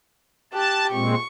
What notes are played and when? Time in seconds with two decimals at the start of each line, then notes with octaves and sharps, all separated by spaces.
0.53 G4 A5 F#6
0.92 A#2 G#3 C4 C#6